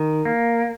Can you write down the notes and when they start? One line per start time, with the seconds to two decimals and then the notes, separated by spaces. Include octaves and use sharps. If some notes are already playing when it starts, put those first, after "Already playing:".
Already playing: D#3
0.25 A#3